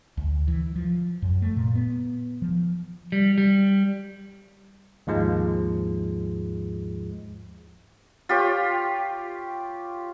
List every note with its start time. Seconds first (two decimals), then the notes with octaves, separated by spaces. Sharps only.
0.17 D2
0.48 E3
0.76 F3
1.22 F#2
1.42 A3
1.57 A#2
1.75 B3
2.42 F3
3.12 G3
3.38 G3
5.07 D#2 G#2 F3 G#3
8.29 F4 G4 C#5